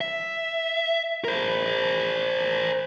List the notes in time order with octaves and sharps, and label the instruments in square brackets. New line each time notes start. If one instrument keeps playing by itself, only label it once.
[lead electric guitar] E5
A#4 C5